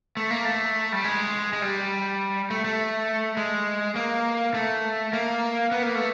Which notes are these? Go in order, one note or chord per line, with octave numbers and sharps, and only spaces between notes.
A3
A#3
A3
G3
G#3
G#3
G3
A3
A3
G#3
A#3
A3
A#3
B3
A#3
A3